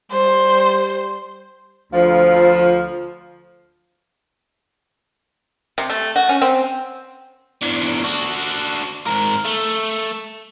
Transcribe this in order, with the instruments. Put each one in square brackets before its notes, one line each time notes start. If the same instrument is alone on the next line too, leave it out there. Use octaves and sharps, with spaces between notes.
[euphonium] G3 [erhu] C5
[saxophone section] D2 F3
[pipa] C3
A3
F#4
C#4
C4
[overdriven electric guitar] E2 D3
D4 F#4
G#2 A#4
A3